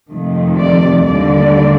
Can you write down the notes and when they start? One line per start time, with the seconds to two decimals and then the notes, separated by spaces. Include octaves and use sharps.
0.10 F2 C3 D#3 A3
0.58 D5
1.06 D#2 D3 G3 A#3 D5